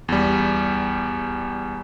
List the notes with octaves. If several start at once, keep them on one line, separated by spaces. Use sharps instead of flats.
E2 G3